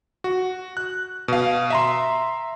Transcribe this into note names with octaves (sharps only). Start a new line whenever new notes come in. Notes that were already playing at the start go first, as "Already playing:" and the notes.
F#4
F#6
B2 F5
E5 A#5 C6